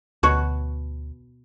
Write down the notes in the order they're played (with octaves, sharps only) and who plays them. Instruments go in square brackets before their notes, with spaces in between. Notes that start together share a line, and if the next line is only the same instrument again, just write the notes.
[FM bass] D2 [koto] B2 F#4 C#5